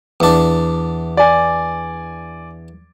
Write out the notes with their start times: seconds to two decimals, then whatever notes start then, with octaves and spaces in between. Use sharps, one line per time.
0.20 E2 D4
1.17 D5 G#5